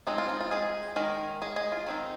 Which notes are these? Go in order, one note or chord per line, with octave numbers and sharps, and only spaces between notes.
F3 G#3 C4 D#4
F4
D#4
F4
G#3 G#4
D#3 G#3 A#4
G#3 G#4
G#3 G#4
F4
D#3 C4 D#4